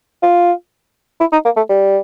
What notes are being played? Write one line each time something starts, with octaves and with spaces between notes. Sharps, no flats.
F4
E4
D#4
A#3
A3
G3